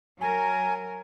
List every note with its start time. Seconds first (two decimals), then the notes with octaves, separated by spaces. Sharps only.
0.21 F#3 A#4 G#5